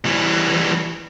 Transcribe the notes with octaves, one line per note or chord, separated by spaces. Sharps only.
E3 G3